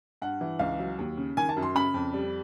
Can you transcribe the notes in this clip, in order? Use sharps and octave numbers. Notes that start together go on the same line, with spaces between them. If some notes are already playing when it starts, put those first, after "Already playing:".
G2 F#5
E3
C#2 F5
F#3
D#2
C#3
D#3 G#5
A5
F#2
C6
C#3 B5
F2
G3